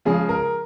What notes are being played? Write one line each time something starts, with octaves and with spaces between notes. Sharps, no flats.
C#3 F3 G#3 C#4 G#4
A#4